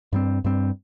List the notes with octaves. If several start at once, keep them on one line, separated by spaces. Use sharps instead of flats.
G2 G3 C4
G2 G3 C4